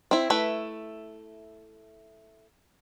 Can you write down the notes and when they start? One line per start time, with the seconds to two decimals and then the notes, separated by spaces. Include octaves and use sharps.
0.11 C4 E4
0.30 A3 E4 B4 E5